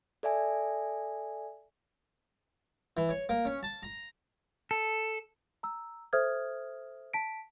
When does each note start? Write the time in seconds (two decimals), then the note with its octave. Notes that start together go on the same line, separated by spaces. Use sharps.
0.23 A4 D5 E5 G#5
2.97 E3
3.09 C#5
3.29 A#3
3.45 C#4
3.63 A5
3.83 A#5
4.71 A4
5.63 A#5 E6
6.13 A4 C5 E5 D#6 F6 G#6
7.14 A5 B6 D7